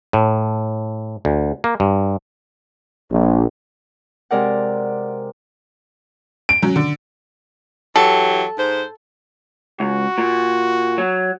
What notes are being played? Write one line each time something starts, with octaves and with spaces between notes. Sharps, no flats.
A2
D2
A#3
G2
A#1
C3 G#3 A#4 D5 F#5
D7
F#3 C#4
D3
E3 F#3 G4 A4
G#2 C5
C#2 F#4
A#2
F#3